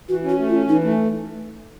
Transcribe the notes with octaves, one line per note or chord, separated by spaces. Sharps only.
E3 F#4
C#4
F#4
A3
F4
C#4
E3 D#4
A3